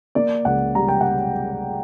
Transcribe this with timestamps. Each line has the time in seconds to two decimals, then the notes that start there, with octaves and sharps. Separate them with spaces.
0.15 A#3 D5
0.45 C#2 F#5
0.75 G3 A#5
0.88 G5
1.01 F#5